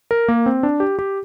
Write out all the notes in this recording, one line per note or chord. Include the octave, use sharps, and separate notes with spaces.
A#4
A#3
C4
D4
G4
G4